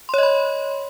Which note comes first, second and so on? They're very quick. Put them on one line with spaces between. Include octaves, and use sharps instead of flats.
C6 C#5 D#5 B5